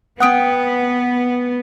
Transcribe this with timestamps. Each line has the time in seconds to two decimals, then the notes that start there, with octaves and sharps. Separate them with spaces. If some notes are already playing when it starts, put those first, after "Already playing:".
0.20 B3 F#5 G5 D#6 F6